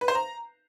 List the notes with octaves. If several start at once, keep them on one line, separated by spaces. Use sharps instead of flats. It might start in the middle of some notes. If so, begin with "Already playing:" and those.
B4
C5
A#5